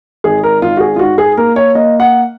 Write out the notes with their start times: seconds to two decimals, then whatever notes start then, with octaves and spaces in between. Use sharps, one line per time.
0.24 G#1 G#4
0.43 A#4
0.62 G#1 F4
0.77 F#4
0.80 G#4
0.96 F4
0.99 G#2 F#4
1.18 G#4
1.37 A#3 A#4
1.56 C#5
1.75 A#3 D#5
2.00 F#5